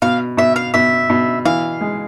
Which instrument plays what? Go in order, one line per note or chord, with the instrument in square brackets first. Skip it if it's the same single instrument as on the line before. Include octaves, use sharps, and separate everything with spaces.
[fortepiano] B2 [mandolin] F5
[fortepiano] B2 [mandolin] E5
[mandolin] F5
[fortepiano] B2 [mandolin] E5
[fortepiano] B2
[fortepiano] E3 [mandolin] F5
[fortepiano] G#3